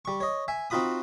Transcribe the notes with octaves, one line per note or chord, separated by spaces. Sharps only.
G3 C#6
C#5 D#5
E5 G#5
C4 D#4 F4 F#4 B5 D#6